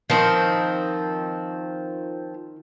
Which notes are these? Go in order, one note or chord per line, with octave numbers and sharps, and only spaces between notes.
D#3 F3 C4